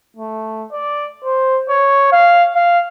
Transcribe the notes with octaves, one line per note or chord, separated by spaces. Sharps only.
A3
D5
C5
C#5
F5
F5